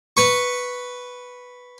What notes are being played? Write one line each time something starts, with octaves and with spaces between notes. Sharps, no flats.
B4 C#6